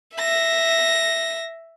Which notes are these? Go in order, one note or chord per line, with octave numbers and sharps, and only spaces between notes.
E5 A#6